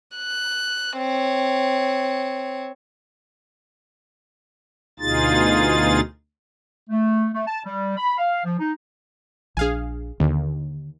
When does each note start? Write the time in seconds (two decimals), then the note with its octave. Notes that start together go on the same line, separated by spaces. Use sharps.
0.16 F#6
0.97 C4 C#5
5.00 D2 B2 D#4 F4 G#4 A6
6.89 A3
7.33 A3
7.47 A5
7.65 G3
7.97 B5
8.18 F5
8.44 F3
8.60 D#4
9.57 A#1 D4 G#4 F5 G#5
10.20 D#2 D3